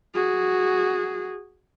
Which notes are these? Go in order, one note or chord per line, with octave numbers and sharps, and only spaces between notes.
F#4 G#4